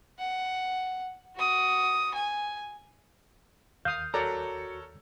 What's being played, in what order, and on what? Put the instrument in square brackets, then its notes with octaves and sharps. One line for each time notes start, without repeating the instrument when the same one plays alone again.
[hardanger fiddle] F#5
F#4 D#6
G#5
[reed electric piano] D#2 G6 [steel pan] F5 D#6
[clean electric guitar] F#4 A#5 [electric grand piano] A4 A#4 C#5 [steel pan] D5